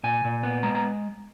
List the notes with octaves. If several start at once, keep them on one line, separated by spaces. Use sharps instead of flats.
A#2 G#5
A#2
B3
G#3 A#5
A#5